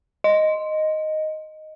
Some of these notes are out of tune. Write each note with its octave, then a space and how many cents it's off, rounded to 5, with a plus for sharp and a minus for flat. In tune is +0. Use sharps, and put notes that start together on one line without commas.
D#5 +0